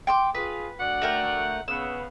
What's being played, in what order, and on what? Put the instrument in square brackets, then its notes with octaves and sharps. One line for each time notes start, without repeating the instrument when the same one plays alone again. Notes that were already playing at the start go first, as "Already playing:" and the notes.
[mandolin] G5 C6 D6
[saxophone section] F4 G#4 [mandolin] B4
[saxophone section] D2 D5 F#5
[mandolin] A3 A#4 G5
[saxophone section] C#3 B3 [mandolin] E6